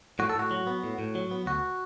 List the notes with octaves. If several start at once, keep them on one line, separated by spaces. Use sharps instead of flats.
A2 F#4
A4
A2 F#4
F#3
B3
A2
A2
F#3
B3
D2 F#4